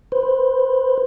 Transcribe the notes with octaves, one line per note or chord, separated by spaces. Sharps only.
B4 C5